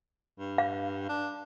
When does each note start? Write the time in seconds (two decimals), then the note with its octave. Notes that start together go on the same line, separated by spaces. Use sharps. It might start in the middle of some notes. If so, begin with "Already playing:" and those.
0.39 G2
0.58 F5
1.09 D4